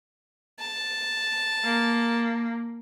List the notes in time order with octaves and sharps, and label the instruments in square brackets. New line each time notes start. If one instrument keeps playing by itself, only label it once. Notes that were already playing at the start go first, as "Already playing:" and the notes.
[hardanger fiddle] A5
[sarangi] A#3